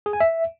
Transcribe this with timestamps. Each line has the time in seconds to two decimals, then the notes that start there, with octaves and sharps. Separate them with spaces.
0.06 G#4
0.13 G#5
0.21 E5